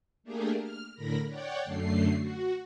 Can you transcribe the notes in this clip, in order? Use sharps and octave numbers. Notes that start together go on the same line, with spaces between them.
A3 A#3 D4 G4 G#4 A#4
F6
A2 D3 A#4 B5 A#6
C#5 D5 F#5 G5
F#2 D3 A3 C7
F#4